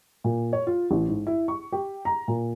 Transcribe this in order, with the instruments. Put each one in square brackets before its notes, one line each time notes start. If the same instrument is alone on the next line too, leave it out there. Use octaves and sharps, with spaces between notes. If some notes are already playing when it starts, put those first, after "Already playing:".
[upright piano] A#2
C#5
F4
A1
G#2
E4
C#6
G4
A#5
A#2